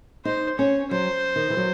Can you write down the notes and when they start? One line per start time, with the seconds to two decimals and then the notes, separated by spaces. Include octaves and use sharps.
0.25 D#4 C5
0.58 C#4 C#5
0.91 F#3 C5
1.36 D#3
1.50 E3
1.57 F#3